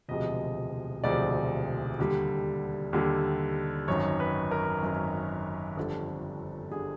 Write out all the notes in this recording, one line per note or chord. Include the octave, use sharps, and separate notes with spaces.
E1 D2 C3 F3 G#3 D#5
E1 D2 C3 F3 G#3 D5
D#2 D3 G3
D#2 D3 G3
G#1 F#2 D#3 C#5
B4
A#4
G#1 F#2 D#3
G1 F2 D3 G3 A4
D3 G3 G#4